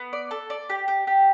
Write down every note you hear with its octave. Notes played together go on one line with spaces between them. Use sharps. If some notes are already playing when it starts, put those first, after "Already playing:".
Already playing: B3
D5
A4
D5
G4
G4
G4